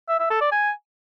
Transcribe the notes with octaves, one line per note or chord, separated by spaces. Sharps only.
E5
E5
A4
D5
G#5